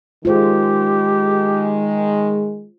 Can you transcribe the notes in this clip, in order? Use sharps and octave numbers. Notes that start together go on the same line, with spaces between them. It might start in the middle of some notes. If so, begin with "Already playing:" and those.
D#3 G#3 F4 G4 C5